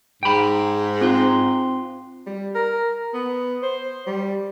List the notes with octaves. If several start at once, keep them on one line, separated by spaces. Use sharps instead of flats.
G#2 G5 B5
C4 F4 C6
G3
A#4
B3
C5
G3